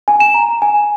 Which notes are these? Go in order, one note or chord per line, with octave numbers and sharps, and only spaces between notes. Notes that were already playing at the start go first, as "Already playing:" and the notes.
G#5
E7
A#5
G#5